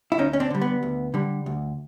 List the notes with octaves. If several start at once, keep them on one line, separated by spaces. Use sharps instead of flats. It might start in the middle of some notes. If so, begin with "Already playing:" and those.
E4
D2 C#4 D#4
C#4
C4 D4
D3 G3
B3
D2
D3 G3
D2